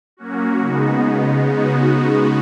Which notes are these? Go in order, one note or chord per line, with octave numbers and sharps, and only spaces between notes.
F#3 A#3 C#4 F#4
C#3 G#3 B3 D#4 F#4
C#3 G#3 B3 D#4
C#3 G#3 B3 D#4 F#4